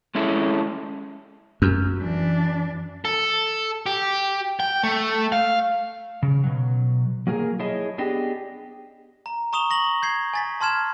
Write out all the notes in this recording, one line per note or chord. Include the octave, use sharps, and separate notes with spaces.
G#3 C#4 E4 A4
F#2
E3 D4
A4
G4
G5
A3
F5
C#3
B2 F#3
F#3 A#3 G#4 A#4
E4 G#4 C#5 D#5 A5
B3 D4 G4 G#4 D#5
A#5
A#5 C#6 D#6 E7 F7 G7
C#6 A#6 F#7
G6 G#6 C7
G#5 A6 B6
A5 C6 F6 G#6 E7